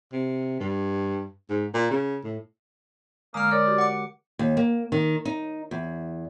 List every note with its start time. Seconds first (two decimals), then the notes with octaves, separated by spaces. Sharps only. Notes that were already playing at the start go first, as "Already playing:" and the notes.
0.12 C3
0.60 G2
1.49 G#2
1.73 A#2
1.90 C#3
2.24 A2
3.34 D3 G#3 A#3 A#5 D#6 F6
3.51 A#4 C#5 D5
3.66 F#4 G4
3.78 F#5 D6
4.39 D#2
4.57 A#3
4.92 D#3
5.25 D#4
5.71 E2